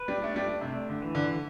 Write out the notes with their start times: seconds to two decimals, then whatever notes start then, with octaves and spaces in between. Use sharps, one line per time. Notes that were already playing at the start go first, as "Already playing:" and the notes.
Already playing: B4
0.08 G3
0.22 A3 D4
0.36 G3
0.61 C3 A3
0.89 D3
1.02 E3
1.15 D3